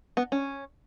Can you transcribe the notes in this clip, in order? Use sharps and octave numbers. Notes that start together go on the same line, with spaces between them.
B3
C#4